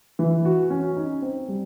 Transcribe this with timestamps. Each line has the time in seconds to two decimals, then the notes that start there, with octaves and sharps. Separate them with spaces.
0.19 E3
0.45 F#4
0.70 C#4
0.96 D#4
1.22 C4
1.48 G3